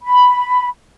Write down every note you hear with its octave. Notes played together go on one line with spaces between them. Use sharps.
B5